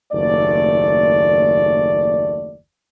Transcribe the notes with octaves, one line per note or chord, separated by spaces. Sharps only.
F#1 D#2 A3 D5